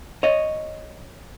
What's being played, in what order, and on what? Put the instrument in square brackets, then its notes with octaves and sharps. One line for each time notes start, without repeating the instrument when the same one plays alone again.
[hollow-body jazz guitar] C#5 D#5